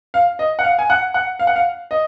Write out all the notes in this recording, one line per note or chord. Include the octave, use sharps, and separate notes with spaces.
F5
D#5
F#5
F5
G#5
F#5
F#5
F5
F#5
F5
D#5